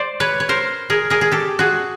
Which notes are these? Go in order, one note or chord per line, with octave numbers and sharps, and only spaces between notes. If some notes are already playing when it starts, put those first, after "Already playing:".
Already playing: C5 D5
B4 C#5
C#5
A#4 C5
G#4 A#4
G#4 A#4
G#4
G4 A4
F#4 G#4